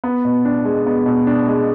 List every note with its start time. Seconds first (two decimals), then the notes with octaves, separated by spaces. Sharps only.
0.04 B3
0.25 B2
0.45 D4
0.65 G#3
0.86 B3
1.06 B2
1.27 D4
1.47 G#3